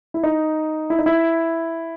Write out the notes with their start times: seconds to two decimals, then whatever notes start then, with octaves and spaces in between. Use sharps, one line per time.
0.14 E4
0.23 D#4
0.90 E4
0.99 D#4
1.06 E4